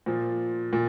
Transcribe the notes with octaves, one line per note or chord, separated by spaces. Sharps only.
A#2 F3
A#2